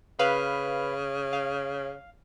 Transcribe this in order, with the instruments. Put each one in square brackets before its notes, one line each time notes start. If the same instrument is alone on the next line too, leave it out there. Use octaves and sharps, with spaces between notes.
[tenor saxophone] C#3 [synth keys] B4 F5 B5
[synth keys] F5